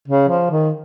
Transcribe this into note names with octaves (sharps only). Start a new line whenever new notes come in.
C#3
F3
D#3